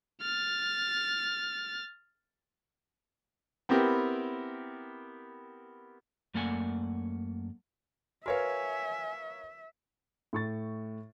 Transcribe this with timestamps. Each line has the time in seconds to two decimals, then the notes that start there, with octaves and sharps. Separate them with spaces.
0.22 F6 A6
3.69 B3 C4 E4 G4 A#4
6.34 F#2 A3 A#3 D5 F#5 G#5
8.26 F#4 A#4 B4 C#5 E5 F5 G#5
10.33 A2 C#6 A6